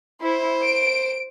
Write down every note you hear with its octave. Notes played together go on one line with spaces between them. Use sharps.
E4 C5
D7